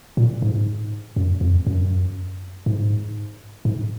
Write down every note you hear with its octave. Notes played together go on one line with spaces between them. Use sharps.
A#2
G#2
F#2
F2
F#2
G#2
G#2